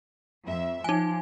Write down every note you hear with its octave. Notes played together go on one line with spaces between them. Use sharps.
F2 E5
F3 D#4 G#5